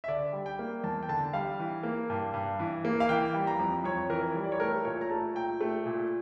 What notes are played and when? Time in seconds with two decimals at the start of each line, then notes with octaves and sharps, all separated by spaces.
0.04 E5
0.08 D3 D5
0.33 G3
0.46 G5
0.59 A#3
0.84 E2 A5
1.03 G5
1.09 D3 A5
1.33 G3 F5
1.59 E3
1.83 A#3
2.10 G2
2.34 G2
2.59 E3
2.85 A#3
3.00 F5
3.09 E3 G5
3.34 G3
3.47 A#5
3.59 F2
3.84 F2 C#5
4.10 E3 A#4
4.35 G3
4.44 D5
4.52 C#5
4.60 A3 A#4
4.85 A#2 C#5
5.01 A#5
5.10 A3 A5
5.35 A#2 G5
5.61 A3
5.86 A#2